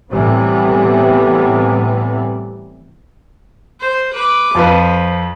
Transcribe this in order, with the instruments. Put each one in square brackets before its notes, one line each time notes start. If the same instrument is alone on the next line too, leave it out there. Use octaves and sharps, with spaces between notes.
[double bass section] A2 C3 E3 G3 B3
[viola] C5
B4 D6
[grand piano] F2 F4 B4 [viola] F3